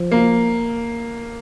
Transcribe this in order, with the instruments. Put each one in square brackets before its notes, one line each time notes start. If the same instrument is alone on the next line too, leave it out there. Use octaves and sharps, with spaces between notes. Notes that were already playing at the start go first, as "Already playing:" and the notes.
Already playing: [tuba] F3
[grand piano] A#3